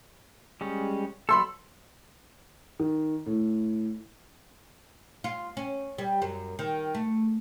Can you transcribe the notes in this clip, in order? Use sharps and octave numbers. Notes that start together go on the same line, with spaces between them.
G3 G#3 C#4
F#3 A4 B5 C6 E6
D#3
A2
F4
C#4
G3
F#2
D#3
A3